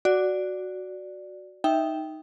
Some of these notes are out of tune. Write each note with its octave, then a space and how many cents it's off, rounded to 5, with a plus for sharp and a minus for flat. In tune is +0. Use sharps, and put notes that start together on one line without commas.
F#4 +0 D5 +0
D#4 +0 E5 -5 G5 +0